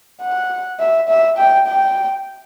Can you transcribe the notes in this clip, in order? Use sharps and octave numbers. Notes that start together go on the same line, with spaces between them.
F#5
E5
E5
G5
G5